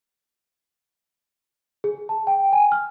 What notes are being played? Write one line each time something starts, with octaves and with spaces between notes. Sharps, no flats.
G#4
A5
G5
G#5
F6